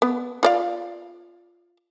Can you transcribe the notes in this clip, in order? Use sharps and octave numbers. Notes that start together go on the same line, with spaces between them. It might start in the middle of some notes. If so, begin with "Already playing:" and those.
B3
F4 D5 F5